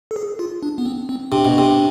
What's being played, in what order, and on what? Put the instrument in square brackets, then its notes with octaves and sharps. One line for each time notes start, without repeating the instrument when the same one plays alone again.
[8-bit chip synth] A4
G#4
F4
D4
B3
C4
C4
[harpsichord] C3 [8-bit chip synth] D4
[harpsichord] B2
C3